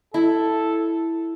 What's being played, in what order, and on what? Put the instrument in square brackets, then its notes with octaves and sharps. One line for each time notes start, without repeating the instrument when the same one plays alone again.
[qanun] E4 [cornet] A4